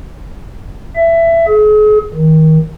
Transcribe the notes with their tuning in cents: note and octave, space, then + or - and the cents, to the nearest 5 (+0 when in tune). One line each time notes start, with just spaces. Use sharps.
E5 +15
G#4 +40
D#3 +25